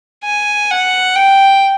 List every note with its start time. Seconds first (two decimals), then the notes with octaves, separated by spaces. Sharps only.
0.24 G#5
0.71 F#5
1.16 G5